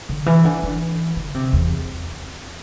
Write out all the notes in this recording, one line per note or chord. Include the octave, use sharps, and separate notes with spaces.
D3
E3
D3
E3
D3
C3
E2